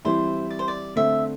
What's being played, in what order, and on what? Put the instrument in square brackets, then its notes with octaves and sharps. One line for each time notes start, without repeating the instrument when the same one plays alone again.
[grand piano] E3 G3 C4 E4 [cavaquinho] C5
[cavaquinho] D5
C5
D5
[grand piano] D3 A3 C4 [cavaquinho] E5